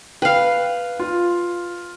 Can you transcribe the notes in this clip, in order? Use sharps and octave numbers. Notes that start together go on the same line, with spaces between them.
B4 F5 G5
F4